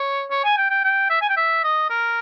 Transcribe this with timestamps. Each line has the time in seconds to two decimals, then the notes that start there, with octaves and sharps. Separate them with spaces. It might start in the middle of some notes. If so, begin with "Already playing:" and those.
Already playing: C#5
0.31 C#5
0.45 G#5
0.58 G5
0.70 G5
0.84 G5
1.10 E5
1.22 G#5
1.29 G5
1.37 E5
1.64 D#5
1.90 A#4